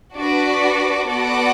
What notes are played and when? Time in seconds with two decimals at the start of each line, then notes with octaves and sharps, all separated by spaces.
0.14 D4 F#4 B4 D5
1.08 B3 F#4 A4 D5 F#5